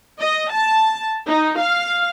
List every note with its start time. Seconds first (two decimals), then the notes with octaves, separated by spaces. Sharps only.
0.20 D#5
0.52 A5
1.26 D#4
1.58 F5